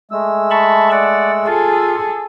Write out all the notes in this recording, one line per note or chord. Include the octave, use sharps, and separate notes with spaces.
G#3 A3 E6
A5 B5 C#6
D5 F#5
F4 G#4 A4